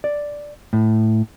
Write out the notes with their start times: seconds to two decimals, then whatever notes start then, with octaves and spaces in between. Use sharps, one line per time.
0.04 D5
0.73 A2